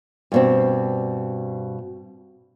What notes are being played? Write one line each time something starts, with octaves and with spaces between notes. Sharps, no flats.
G2 B2 C4